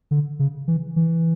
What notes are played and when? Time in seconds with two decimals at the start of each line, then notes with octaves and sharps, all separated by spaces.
0.11 D3
0.39 C#3
0.68 E3
0.96 E3